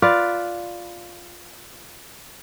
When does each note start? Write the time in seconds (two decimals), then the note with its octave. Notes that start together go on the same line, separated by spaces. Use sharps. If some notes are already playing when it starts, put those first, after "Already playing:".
0.02 F4 B4 D5